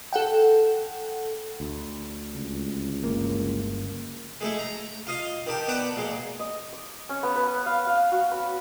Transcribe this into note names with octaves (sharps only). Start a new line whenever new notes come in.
A4 F#5 G5
D2
C#2
G1 A#3
G#3 A3 E4
A#5
F4 D#5 F5
D#3 G4 A5
B3 D5 F#5 A5
A#2 G#3
D#5
D6
C#4
B3
B4
F5
F5
F#4
B5